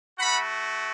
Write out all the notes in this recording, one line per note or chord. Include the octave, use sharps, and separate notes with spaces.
A3 F#4 F#5 B5